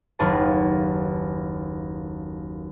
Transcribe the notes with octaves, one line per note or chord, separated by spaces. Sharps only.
F#1 D#2 F4 G#4 B4 A5